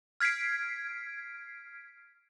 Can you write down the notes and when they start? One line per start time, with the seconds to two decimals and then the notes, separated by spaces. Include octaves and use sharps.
0.20 F6 G#6 B6 C7 D7